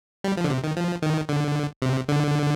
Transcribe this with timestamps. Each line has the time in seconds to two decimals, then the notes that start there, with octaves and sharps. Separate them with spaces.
0.24 G3
0.37 F3
0.44 D3
0.50 C3
0.64 D#3
0.77 F3
1.02 D#3
1.29 D3
1.82 C3
2.09 D3